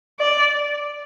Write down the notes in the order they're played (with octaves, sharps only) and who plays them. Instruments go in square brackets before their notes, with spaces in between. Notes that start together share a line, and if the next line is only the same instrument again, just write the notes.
[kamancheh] D5